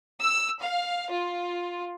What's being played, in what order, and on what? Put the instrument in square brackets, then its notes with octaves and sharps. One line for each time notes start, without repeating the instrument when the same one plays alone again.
[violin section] E6
F5
F4